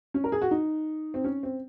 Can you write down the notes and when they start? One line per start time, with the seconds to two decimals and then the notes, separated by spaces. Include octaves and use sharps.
0.14 C#4
0.24 A#4
0.32 G#4
0.42 F#4
0.51 D#4
1.14 C4
1.24 C#4
1.43 C4